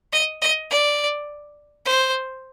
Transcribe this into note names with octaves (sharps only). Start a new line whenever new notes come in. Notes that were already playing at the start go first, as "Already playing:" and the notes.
D#5
D#5
D5
C5